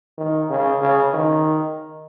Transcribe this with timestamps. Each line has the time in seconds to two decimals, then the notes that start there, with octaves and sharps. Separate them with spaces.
0.18 D#3
0.50 C#3
0.82 C#3
1.14 D#3